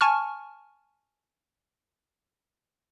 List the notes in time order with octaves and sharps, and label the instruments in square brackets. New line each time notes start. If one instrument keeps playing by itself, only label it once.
[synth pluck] G#5 A5 C#6 F6